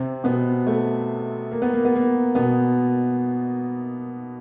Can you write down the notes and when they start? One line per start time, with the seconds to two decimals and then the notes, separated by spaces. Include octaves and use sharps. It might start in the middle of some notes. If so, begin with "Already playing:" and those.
Already playing: C3 C4
0.24 B2 B3
0.67 A3
1.52 A#3
1.62 B3
1.74 A#3
1.85 B3
1.95 A#3
2.35 B2 B3